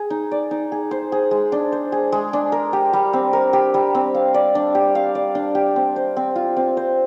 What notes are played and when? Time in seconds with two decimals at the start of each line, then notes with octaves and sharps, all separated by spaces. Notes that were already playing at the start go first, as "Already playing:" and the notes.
Already playing: G#4
0.10 D#4
0.31 D5
0.51 D#4
0.72 G#4
0.91 C5
1.12 G#4
1.31 G#3
1.52 D4
1.72 C5
1.92 G#4
2.12 G#3
2.33 D4
2.52 A#4
2.73 G4
2.93 G3
3.13 C4
3.33 A#4
3.53 G4
3.74 G3
3.95 C4
4.14 F5
4.34 D5
4.55 D4
4.75 G4
4.95 F5
5.15 D5
5.35 D4
5.55 G4
5.76 C4
5.96 C5
6.17 C4
6.36 F4
6.57 C4
6.77 C5